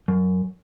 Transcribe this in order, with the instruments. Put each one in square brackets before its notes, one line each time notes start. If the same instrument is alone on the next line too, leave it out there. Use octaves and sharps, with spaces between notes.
[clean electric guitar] F#2